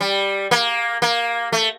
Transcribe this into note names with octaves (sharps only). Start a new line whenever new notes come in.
G3
A#3
A#3
A3